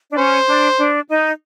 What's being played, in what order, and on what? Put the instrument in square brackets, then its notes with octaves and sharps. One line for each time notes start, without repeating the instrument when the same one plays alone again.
[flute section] D4
[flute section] C#4 [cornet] C5
[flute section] D4
D4
D#4